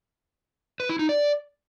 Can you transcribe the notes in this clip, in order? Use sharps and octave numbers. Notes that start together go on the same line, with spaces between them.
B4
E4
D#4
D5